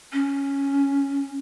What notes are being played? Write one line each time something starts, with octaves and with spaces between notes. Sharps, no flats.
C#4